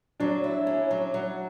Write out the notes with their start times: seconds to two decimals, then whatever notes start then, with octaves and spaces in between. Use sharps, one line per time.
0.20 F#3 D4
0.44 E4
0.67 C#4
0.91 F#3
1.14 F#3